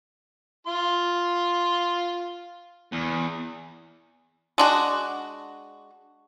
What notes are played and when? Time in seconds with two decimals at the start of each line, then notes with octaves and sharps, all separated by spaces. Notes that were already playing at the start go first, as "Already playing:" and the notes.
0.67 F4 C6
2.92 E2
4.58 G#3 D4 F#4